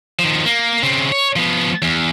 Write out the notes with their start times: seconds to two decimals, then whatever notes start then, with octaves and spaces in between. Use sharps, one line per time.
0.19 D#3 F3
0.45 A#3
0.83 C#3 C4
1.12 C#5
1.36 F3 B3
1.82 E2